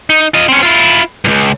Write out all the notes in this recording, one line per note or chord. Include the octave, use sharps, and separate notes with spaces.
D#4
F4 D#5
C4 C#4
E4 F4
C#2 G2